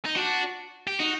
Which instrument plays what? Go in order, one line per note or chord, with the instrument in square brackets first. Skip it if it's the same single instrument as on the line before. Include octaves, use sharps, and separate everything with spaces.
[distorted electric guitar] D#4
[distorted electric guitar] D4 [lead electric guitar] F#4
[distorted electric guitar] G4
[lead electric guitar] D#4 [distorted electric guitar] F#4